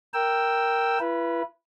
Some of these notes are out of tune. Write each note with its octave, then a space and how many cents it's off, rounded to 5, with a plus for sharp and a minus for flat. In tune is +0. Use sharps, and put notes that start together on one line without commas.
A#4 +0 G5 +0 E6 +0
E4 +40 B4 -15